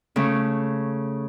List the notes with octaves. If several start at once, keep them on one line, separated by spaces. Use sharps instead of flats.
C#3 A3